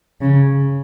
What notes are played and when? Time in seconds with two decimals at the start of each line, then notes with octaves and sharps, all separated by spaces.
0.21 C#3